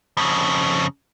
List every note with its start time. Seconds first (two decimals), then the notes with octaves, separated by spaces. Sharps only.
0.17 F2 C#3